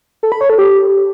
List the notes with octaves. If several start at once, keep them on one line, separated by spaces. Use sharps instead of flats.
A4
B5
C#5
A4
G4